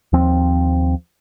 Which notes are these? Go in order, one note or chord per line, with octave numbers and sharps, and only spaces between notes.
D#2 F3 C4